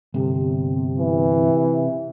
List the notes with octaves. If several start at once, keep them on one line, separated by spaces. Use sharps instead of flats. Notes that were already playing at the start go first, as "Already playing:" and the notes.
G1 C3
E3